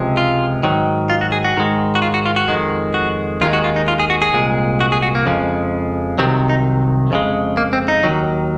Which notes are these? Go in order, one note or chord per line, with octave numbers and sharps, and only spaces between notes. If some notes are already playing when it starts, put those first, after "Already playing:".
Already playing: C#2 C3 F3 G#3
F4
G#2 D#3 F#3
F4
F#4
G#4
F#4
G#2 D#3 G#3
F#4
F4
F#4
F4
F#4
F2 D#3 G#3
F#4
D#2 D#3 G#3 F4
F#4
F4
D#4
F4
G#4
F#4
G#4
C2 A#2 G#3
F#4
G#4
F#4
A#3
F2 C#3 F3 G#3
C2 C3 D#3 F#3 C4
D#4
F2 C#3 G#3
A#3
C4
D#4
D#2 D#3 F#3